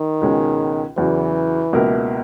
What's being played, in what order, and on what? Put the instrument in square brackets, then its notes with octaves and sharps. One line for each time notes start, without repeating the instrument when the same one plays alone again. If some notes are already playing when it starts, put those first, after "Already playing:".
Already playing: [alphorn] D#3
[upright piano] C#2 B2 G#3 C#4
[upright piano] E2 C#3 F#3 [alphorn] E3
[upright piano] C#2 B2 A#3 E4 A#4